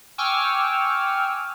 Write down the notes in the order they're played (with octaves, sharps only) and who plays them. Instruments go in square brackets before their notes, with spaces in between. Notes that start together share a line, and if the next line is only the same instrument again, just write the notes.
[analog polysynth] G5 G#5 C#6 D6 E6 F6